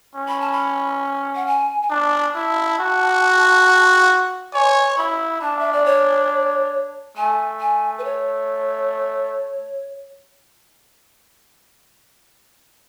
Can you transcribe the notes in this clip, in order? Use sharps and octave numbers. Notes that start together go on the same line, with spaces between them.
C#4
B5
A5
B5
F#5
G#5
G#5
D4 A5
E4 A5
F#4
C#5 G#5
E4 B5
D4 A5
E5
D5
C#5
A3 G#5
G#5
B4
C#5